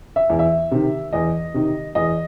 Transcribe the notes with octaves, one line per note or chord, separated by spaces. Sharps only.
E5
E2
E5
C3 D#3
E2 D#5
C3 D#3
E2 D#5